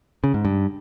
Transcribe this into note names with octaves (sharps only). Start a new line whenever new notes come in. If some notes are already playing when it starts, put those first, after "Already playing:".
C#3
G#2
G2